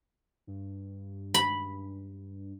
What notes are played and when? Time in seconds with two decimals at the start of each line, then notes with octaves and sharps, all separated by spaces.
0.47 G2
1.34 B5